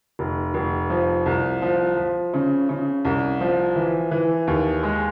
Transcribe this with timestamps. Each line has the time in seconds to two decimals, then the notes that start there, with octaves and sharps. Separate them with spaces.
0.19 F1
0.54 F1
0.90 F3
1.26 C2
1.62 F3
1.97 F3
2.34 C#3
2.69 C#3
3.05 C2
3.41 F3
3.76 E3
4.11 E3
4.47 D#2
4.83 G#3